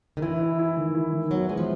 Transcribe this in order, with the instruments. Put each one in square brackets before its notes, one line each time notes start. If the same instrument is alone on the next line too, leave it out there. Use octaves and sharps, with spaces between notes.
[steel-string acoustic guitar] D#3
[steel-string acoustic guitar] E3 [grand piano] E4
[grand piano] E4
E4
D#3
E4
D#3
[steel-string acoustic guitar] F#3 [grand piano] B3
[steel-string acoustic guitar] E3 [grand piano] G#3
[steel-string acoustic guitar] F3